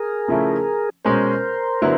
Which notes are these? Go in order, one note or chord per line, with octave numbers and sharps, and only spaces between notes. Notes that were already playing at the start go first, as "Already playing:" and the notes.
Already playing: G#4 A#4
C#3 F3 A3 C#4 E4
B2 G#3 C#4 A#4 C5
D3 F#3 B3 E4